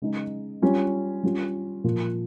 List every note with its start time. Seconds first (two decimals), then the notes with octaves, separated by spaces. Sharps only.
0.02 C#3 G#3 D#4
0.62 G3 C#4 F4
1.23 G3 C#4 F4
1.84 A#2 F3 A#3 F4